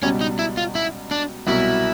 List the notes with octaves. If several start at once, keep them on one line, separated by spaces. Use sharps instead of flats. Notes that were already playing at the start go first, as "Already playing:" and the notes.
C#2 B2 G3 C#4
D#4
E4
F4
E4
D4
C2 B2 F#3 E4